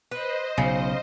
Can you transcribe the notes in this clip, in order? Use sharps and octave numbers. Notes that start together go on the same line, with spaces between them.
B4 C5 D#5
B1 C#3